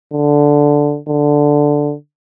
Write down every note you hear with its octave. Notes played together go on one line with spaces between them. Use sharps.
D3
D3